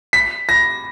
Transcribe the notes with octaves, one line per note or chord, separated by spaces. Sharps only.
B6
A#6